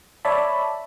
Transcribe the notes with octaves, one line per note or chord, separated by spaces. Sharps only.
C#5 D5 E5 A5 B5